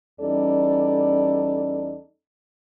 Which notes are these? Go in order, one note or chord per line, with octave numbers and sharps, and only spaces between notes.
E2 G3 C#4 D#4 A4 D5